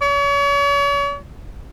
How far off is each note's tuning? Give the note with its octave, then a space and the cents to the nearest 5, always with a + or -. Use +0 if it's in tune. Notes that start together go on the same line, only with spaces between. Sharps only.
C#5 +40